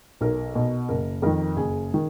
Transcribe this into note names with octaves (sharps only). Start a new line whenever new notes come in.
B1 A#4
B2
F#1 A#4
F2 D#3 A#4
F#1 G#4
D#3